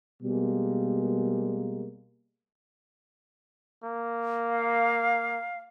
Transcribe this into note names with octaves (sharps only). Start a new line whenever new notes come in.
B2 G3 G#3 A#3
A#3
F5